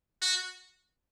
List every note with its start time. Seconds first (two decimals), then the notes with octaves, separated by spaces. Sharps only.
0.22 F#4